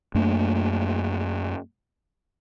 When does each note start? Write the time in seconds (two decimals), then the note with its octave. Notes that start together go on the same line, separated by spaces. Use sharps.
0.15 F#2 A3 A#3 D4